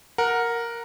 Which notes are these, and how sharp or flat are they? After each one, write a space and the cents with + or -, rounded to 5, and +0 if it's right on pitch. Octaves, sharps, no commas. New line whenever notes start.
A#4 +0 F#5 -15